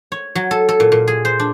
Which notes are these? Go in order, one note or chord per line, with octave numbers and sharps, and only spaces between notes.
C#5
F#3
A4
A4
A#2
A#2
G#4
C5
D4